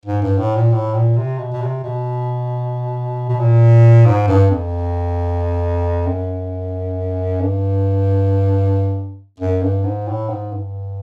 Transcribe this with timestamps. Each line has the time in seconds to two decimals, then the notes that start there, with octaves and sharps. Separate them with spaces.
0.06 G#2
0.22 G2
0.39 A2
0.56 A#2
0.72 A2
0.94 A#2
1.17 C3
1.38 B2
1.53 B2
1.62 C3
1.84 B2
3.29 B2
3.40 A#2
4.06 G#2
4.28 G2
4.51 F2
6.07 F#2
7.41 G2
9.40 F#2
9.63 G2
9.85 G#2
10.08 A2
10.30 G#2
10.52 G2